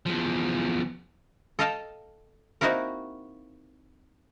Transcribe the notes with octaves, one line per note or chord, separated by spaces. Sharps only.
E2 F3
A4 D#5 F5 G5 A5
A#3 C4 D#4 E4 F#4 A#4